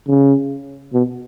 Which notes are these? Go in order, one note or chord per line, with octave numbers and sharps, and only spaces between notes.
C#3
B2